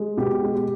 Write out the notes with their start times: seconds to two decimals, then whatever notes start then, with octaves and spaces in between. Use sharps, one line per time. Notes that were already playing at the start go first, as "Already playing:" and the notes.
Already playing: G#3
0.17 B2 G4
0.43 G#3